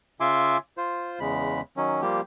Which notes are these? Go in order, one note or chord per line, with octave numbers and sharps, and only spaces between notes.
C#3 F4 E5 G#5 C6 D6
F4 C5
E2 C#3 G#3 B5
D#3 F#3 C#4
F3 G3 A#3 G4